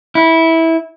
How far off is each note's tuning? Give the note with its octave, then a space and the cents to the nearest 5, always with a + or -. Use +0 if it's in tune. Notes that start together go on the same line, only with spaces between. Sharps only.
E4 -15